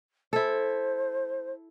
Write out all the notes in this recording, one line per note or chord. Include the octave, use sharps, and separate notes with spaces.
E4 A4 C5